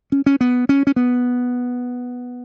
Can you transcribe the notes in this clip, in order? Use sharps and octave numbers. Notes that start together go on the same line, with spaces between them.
C#4
C#4
B3
C#4
C#4
B3